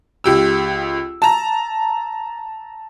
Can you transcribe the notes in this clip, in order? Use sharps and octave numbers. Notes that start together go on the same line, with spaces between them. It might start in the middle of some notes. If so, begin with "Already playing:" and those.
C#2 G4 E6
A5 A#5